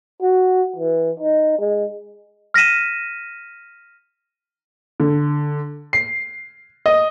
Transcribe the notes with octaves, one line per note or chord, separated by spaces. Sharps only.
F#4
E3
D#4
G#3
F6 A#6 B6 D#7 E7
D3
C7
D#5